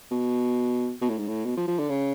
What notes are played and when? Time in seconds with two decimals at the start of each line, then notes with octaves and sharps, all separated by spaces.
0.11 B2
1.01 B2
1.09 A2
1.18 G#2
1.28 A2
1.45 B2
1.57 F3
1.67 F3
1.79 D3
1.89 C#3